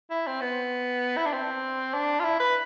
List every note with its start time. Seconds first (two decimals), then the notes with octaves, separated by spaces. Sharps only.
0.11 E4
0.27 C4
0.41 B3
1.17 E4
1.25 D4
1.33 C4
1.94 D4
2.20 F4
2.24 E4
2.40 B4